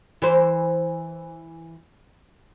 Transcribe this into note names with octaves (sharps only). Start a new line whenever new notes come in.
E3 C5